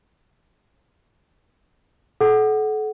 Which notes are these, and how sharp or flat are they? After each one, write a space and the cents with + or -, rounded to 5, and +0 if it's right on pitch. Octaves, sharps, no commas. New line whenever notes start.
A4 -40 F#5 +10